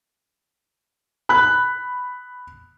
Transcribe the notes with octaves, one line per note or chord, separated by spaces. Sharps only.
B5 F#6